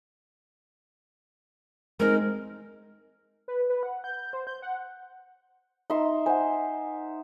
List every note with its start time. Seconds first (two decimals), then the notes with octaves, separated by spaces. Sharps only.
2.00 G#3 C4 D#4 A#4
3.48 B4
3.69 B4
3.83 F#5
4.04 G6
4.33 C5
4.47 G6
4.62 F#5
5.90 D#4 E5 C6
6.26 C5 F#5 G#5